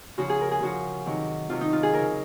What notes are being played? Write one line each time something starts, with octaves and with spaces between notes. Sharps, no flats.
C#3 F3 F#4
G#4
A#4
G#4
C#3 F3 F#4
C3 D#3 F#3
C3 D#3 F#3 F4
D#4
F4
G#4
C#3 F#3 A#4